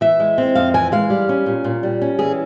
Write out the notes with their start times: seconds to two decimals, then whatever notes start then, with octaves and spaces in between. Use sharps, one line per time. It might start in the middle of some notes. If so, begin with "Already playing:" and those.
0.01 E3 E5
0.20 G#3
0.38 C4
0.55 F2 F5
0.74 E3 G#5
0.92 G#3 F5
1.10 G3
1.29 C#4
1.46 A#2
1.64 A#2
1.83 G3
2.02 C#4
2.19 E3 G#4